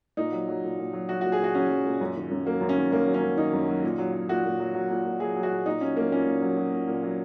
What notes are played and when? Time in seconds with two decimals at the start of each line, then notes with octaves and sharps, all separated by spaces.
0.17 A#2 D#4
0.32 F#3
0.48 F#3
0.64 A#2
0.79 A#2
0.94 F#3
1.09 F#3 F#4
1.21 F#4
1.24 A#2
1.32 G#4
1.40 A#2 F#4
1.55 F#3 C#4
1.70 F#3
1.85 A#2
2.01 F#2
2.16 D#3
2.31 F#2
2.46 F#3 A#3
2.61 F#2
2.69 C#4
2.76 D#3
2.92 F#2 A#3
3.08 F#3
3.14 C#4
3.22 F#2
3.37 D#3 D#4
3.53 F#2
3.68 F#3
3.83 A#2
3.98 F#3
4.13 F#3
4.29 A#2 F#4
4.44 A#2
4.60 F#3
4.75 F#3
4.90 A#2
5.06 A#2
5.20 F#3 G#4
5.36 F#3
5.43 F#4
5.51 A#2
5.66 A#2 D#4
5.81 F#3 C#4
5.96 F#3 A#3
6.11 A#2 C#4
6.26 A#2
6.42 F#3
6.57 F#3
6.72 A#2
6.88 A#2
7.03 F#3